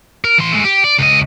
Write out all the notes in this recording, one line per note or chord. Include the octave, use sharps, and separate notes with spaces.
A#4
E3 C6
G#3 A3
G4
D5
C#2 D#5